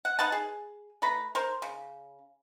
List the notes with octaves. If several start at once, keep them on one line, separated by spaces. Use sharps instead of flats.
F#5
D#4 B4 F#5 A5
G#4
A3 B4 A#5 B5
A#4 C5
C#3